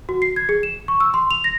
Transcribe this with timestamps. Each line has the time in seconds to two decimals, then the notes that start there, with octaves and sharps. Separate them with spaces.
0.09 F#4
0.22 C7
0.36 G#6
0.49 G#4
0.63 E7
0.88 C#6
1.00 E6
1.14 C6
1.31 F7
1.44 A#6